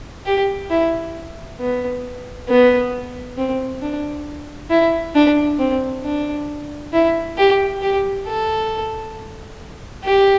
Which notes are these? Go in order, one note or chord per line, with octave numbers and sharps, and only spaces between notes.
G4
E4
B3
B3
C4
D4
E4
D4
C4
D4
E4
G4
G4
A4
G4